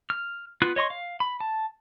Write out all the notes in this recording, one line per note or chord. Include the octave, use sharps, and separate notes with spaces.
F6
B3 F4 F#6
C#5 D#5 C6 C#6
F5
B5
A5